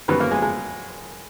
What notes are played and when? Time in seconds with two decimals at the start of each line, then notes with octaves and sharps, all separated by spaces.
0.08 F#2 D#3 G3 B3 B4
0.20 A#3 A#4
0.31 G#3 G#4
0.42 G#3 G#4